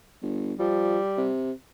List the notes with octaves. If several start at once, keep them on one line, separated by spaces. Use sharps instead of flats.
G1
F3 G3
C3